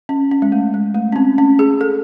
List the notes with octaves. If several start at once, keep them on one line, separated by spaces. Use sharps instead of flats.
C#4
C#4
G#3
A3
G#3
A3
C#4
C4
C#4
G#4
A4